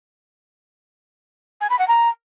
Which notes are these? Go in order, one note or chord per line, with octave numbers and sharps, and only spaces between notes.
G#5
B5
F#5
A#5